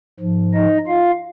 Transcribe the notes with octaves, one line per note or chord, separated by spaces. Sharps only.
G#2 F3
D#4 D#5
F4 F5